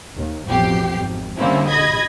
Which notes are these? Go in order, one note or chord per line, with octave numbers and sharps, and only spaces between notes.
D#2
A1 F2 B2 F#3 G4 C7
G#1
D3 G3 A#3 C4 C#4 E4
D#5 B5 D#6 G#6 A#6